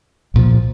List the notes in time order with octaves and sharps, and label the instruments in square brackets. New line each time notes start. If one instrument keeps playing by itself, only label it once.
[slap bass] C2 A#2 F3